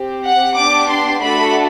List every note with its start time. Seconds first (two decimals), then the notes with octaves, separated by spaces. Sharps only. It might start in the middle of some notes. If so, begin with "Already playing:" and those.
Already playing: C4 G4
0.24 F#5
0.56 B3 D4 G4 D6
0.90 C6
1.22 A3 D4 F#4 A4 B5